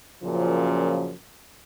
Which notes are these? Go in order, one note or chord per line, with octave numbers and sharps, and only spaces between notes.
F#2 A#2 C#3 F3